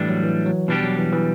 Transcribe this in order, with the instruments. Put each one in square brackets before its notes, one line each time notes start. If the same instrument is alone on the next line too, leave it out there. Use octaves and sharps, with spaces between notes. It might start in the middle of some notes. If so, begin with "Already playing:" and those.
Already playing: [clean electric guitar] A2 G3 D4 [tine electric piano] E3
[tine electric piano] F#3
E3
F#3
[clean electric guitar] B2 G3 D4 G4 [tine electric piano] E3
[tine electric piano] F#3
E3
E3